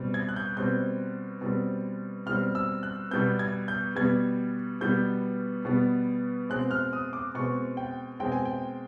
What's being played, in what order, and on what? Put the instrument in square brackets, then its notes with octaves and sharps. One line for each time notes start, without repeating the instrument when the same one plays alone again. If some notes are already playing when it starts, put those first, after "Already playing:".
Already playing: [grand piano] B2 G3 C4
G#6
F#6
G6
B2 G3 C4 G6
B2 G3 C4
B2 G3 C4 F6
E6
F#6
B2 G3 B3 G6
G#6
G6
B2 G3 B3 G#6
B2 G3 B3 G6
B2 G3 B3
B2 G#3 C4 F#6
F6
D#6
D6
B2 G#3 C4 C#6
G5
B2 G#3 C4 G5
G#5
G5